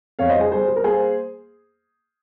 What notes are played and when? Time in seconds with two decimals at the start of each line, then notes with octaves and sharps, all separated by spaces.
0.19 F2 C#5 F5
0.30 C5 D#5
0.35 G3
0.40 G#4 C5
0.51 G3 G#4 C5
0.68 G3
0.76 A#4
0.84 A#3 G#4 C5